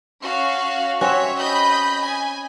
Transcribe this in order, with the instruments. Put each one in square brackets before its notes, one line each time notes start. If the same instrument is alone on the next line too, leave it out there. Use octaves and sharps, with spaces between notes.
[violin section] C#4 F#4 F5
[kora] C4 C#4 F#4 [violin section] C#5 E5
[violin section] D#5 B5 G6
G#5